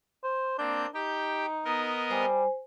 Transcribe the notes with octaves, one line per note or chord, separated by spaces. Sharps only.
C5
A#3 C4 D4 G6
D#4 G4 G5
B3 A#4 D#5
G3 C5 G#5